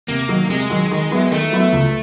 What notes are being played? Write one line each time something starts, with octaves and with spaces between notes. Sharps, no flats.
C3 A#3
D#3 F#3
C3 G#3
D#3 F#3
D#3
F#3 B3 E4
D#3 A3
F#3 B3 E4
C#2